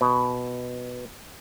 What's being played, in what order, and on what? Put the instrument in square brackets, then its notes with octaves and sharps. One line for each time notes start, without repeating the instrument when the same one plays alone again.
[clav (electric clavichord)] B2